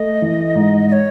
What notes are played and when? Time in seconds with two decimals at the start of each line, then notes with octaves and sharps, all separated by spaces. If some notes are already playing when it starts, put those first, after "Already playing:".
Already playing: A3 D#5
0.22 E3
0.55 G#2
0.88 D#5
0.92 C#5